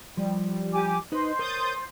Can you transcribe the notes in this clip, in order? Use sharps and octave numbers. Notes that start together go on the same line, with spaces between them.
F3 G3
G4 G#5 D6
D#4 B4 C5 D#5 C6
A#4 C#5 D#6 G6 A6